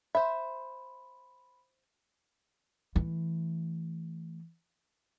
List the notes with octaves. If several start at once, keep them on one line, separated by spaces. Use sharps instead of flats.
C5 E5 B5 C6
E3 A3